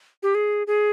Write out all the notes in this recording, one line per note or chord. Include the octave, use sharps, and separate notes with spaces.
G4
G#4
G#4